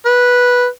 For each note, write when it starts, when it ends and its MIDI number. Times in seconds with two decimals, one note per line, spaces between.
0.06 0.66 71